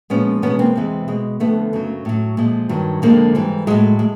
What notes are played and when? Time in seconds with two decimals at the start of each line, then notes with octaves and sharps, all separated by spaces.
0.10 A#2 F3 G#3 B3 C#4
0.42 E2 B2 G#3 B3 C#4
0.59 A#3 C4
0.76 E2 C3 E3 G#3
1.08 B2 G#3
1.40 F2 D3 F3 A3 B3
1.73 F#2 C#3 F#3
2.05 A2 F#3
2.37 A#2 F3 G#3
2.69 G2 D#3 F#3
3.02 F2 D3 F3 G#3 A#3
3.35 G#2 E3 G3
3.67 A2 F#3 G#3
3.99 G#3